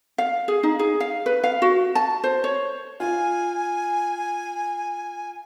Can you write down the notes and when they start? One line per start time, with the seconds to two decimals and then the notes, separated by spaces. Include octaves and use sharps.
0.18 F5
0.48 G#4
0.63 D#4
0.79 G#4
1.00 F5
1.26 B4
1.44 F5
1.62 F#4
1.95 A5
2.24 C5
2.44 C#5
3.00 F4 G#5